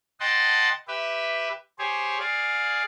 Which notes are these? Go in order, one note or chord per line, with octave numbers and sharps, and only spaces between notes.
D#5 F#5 G5 A5 C6
G4 B4 E5
G4 G#4 C5 C#5
G#4 D5 F5